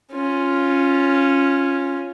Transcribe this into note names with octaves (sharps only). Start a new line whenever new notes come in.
C#4 F4